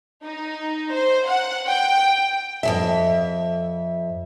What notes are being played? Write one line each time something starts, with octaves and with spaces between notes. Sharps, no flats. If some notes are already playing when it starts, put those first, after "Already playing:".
D#4
C5
F#5
G5
F2 C#3 E5